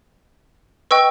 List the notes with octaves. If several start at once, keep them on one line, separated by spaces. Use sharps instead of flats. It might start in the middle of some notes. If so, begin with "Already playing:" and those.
B4 D#5 G5 C#6 E6